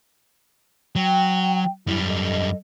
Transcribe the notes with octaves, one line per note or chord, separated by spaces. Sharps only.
F#3 G5
F#2 G3 E4
A4 D#5